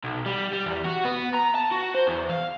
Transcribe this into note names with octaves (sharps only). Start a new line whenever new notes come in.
B1
G3
G3
E2
F#4
B3
A#5
A5
F#4
C5
E2
F5